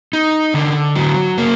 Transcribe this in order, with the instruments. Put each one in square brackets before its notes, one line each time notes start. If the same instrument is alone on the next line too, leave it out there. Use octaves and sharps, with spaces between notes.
[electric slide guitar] D#4
D3
F#3
A#3